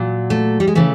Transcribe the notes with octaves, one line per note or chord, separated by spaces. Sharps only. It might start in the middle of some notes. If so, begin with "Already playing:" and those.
Already playing: A#2 F#3
A3
G3
G#3
C#3 E3 A3